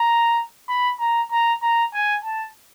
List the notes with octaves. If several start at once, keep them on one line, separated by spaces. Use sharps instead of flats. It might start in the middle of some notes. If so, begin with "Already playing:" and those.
Already playing: A#5
B5
A#5
A#5
A#5
G#5
A5